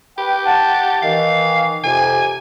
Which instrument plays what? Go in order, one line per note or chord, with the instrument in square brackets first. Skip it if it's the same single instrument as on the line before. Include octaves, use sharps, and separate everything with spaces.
[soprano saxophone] G4 [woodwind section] B4 G5
[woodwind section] F#5 A5
[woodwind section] D#3 E3 [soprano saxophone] F5
[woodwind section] F2 C3 [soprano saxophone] G#5